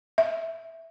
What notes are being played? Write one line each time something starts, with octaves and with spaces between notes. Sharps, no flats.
E5